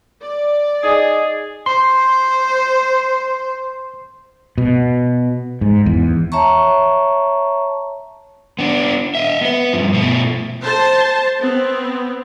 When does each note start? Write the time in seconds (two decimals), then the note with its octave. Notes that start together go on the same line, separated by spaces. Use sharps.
0.21 D5
0.83 D#4 G#4 D#5 A6
1.66 C5 C6
4.58 B2
5.61 G#2
5.86 E2
6.32 C#5 E5 A5 A#5 C#6
8.59 B3 D4
9.15 D#5 E5
9.41 B3 B4
9.73 G2 F3
9.93 B2 A3
10.65 C5 A5
11.41 B3 C4